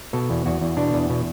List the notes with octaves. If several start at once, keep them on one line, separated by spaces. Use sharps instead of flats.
B2 A4
E2
E2 F#4
E2
B2 D4
E2
B2